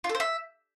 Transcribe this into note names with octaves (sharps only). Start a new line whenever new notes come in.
F4
A4
C5
E5